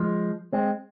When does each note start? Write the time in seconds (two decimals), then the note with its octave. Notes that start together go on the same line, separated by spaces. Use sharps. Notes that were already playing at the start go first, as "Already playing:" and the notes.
Already playing: F3 G#3
0.53 G#3 C4